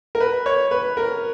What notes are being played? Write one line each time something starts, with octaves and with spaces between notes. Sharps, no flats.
A#4
B4
C#5
B4
A#4